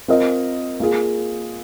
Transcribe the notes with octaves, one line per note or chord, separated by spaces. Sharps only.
C4 F4 A#4 D#5
A#3 F4 G#4